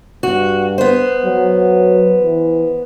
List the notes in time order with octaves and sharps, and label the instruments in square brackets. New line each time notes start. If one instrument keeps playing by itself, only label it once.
[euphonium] G2 [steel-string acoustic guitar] F#4
[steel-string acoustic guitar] B3 C5
[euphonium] F#3
E3